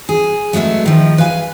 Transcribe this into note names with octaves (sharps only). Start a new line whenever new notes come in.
G#4
F#3 G#3 A3 B3 E4
D#3 F3
B4 F5 G#5